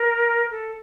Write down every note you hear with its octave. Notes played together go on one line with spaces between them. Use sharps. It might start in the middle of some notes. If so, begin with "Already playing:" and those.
Already playing: A#4
A4